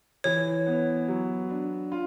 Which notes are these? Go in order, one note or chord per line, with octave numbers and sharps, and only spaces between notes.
E3 C#5
B3
F#3
D4
F4